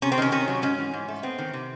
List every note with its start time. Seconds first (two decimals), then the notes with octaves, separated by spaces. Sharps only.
0.02 C3 C#4
0.12 C4
0.18 D#3 C#4
0.32 C3 C#4
0.48 F#3
0.62 G#2 C#4
0.78 E3
0.94 G#2
1.08 A3
1.23 B3 C4
1.38 D#3
1.53 C3